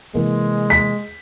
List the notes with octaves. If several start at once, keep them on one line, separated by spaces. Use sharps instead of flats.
C3 E3 G#3 A#3
B6